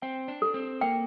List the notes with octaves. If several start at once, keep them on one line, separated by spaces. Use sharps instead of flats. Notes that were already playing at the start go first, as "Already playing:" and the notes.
C4 G5
D4
A4
C4
A#3 G5